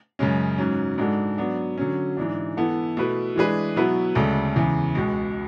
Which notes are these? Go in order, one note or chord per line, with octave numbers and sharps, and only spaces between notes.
F#2 C#3 G#3 C#4
G#2 F#3 C#4
G#2 G#3 D4 F#4 A4
F#3 B3 D4
D3 F#3 C#4
G#2 E3 G#3 D4
E3 B3 E4 A4
B2 A3 E4 B4
E3 G#3 D4 G#4 B4
B2 F#3 B3 E4 B4
D2 C#3 G#3 D4 A4
E2 C#3 E3
C#2 B2 G#3